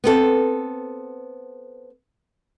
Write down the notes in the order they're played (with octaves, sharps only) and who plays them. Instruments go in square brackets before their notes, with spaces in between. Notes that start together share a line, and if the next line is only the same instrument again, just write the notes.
[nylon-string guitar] B3 C4 A4